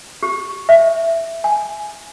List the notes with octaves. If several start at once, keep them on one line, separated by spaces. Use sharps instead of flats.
G4
E5
G#5